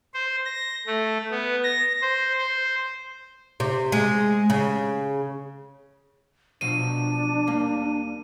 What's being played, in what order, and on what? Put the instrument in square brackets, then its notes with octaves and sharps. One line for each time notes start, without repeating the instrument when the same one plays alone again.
[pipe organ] C5
A#6
A3
B3
A#6
C5
C5
[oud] C3
G#3
C#3
[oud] B2 F3 F#3 [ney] D4 [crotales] D#7
[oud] D#2 G3 A#3